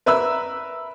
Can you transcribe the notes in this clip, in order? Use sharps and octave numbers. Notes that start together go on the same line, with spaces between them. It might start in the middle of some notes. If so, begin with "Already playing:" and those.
A#4 B4 E5 B5 E6